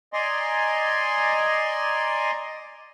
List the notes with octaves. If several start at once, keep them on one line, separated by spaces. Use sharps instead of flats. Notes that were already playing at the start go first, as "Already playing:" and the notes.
D5 D#5 G#5 A#5 C6